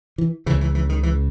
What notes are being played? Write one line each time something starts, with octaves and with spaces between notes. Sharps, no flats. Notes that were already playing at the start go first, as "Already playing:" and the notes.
E3
C#2 C#3 E3
E3
E3
D#3
E3